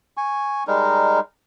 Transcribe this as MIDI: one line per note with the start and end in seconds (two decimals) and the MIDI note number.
0.17 0.63 80
0.17 0.63 85
0.67 1.20 55
0.67 1.20 56
0.67 1.20 63
0.67 1.20 70